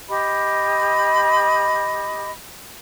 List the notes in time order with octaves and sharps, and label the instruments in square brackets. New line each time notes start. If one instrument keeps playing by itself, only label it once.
[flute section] G4 D#5 B5